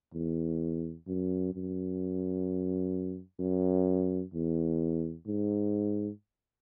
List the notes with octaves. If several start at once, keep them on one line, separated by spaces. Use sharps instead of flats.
E2
F#2
F#2
F#2
E2
G#2